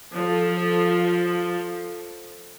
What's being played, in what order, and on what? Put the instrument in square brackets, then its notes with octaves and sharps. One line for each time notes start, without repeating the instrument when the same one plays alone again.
[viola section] F3 A4